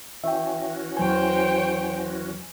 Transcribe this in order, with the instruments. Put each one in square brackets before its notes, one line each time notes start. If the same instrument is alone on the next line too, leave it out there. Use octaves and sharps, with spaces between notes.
[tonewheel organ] E3 C#4 F#4 [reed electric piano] E5 G5
[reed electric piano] E2 F#3 G#5 [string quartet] C5 C#5 G5